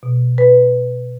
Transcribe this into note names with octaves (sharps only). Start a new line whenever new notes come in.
B2
B4